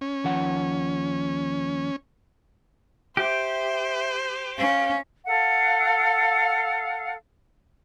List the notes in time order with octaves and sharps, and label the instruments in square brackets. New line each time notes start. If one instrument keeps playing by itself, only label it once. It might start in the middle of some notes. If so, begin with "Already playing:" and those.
[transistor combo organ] C#4
[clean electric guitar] D#2 F3 F#5
[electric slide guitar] G4 [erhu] C5 [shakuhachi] E5
[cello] C#4 [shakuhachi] F5
[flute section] A4 F5 F#5